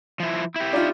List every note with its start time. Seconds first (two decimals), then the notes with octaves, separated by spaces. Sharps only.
0.20 F3 E4
0.56 E4 G4
0.73 D4 D#4 F4